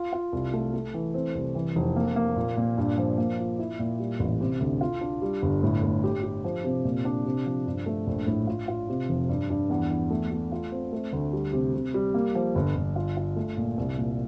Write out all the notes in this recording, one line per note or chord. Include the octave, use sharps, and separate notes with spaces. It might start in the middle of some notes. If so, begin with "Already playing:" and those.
Already playing: F4
F4
C2
A3
A3
E3
C4
C2
E3
F1
A#3
A#3
A#2
A#2
G2
F3
A#3
F4
E4
A#2
G3
A1
C3
D2
F4
D4
G3
G1
A2
A2
G4
G4
F3
C3
A#2
D4
C3
F3
G2
A3
A#1
A2
F4
F4
C3
F1
G2
G2
E2
E2
A3
A3
F4
C4
A3
D2
G3
C3
C3
G3
A#3
F3
G1
G1
F4
F4
A3
A#2
C2
A#2